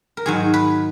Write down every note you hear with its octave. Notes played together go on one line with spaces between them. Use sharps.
A#4
G#2 D#3 F#3 G#4
B4